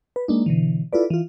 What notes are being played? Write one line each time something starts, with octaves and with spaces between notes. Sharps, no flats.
B4
G#3 A#3 D4 D#4
B2 D3 E3
E4 F4 A4 B4 D5
E3 F4